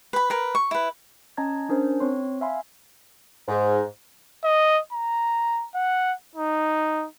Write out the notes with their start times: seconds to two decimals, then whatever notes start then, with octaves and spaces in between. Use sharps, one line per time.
0.13 B4 B5
0.30 A#4 B4
0.55 C#6
0.71 E4 B4
1.37 C#4 D#5 A5 A#5 G#6
1.69 C#4 D4 A#4 C5
2.00 C4 C#5 C6
2.41 E5 F5 G#5 B5 C6
3.48 G#2
4.44 D#5
4.93 A#5
5.75 F#5
6.35 D#4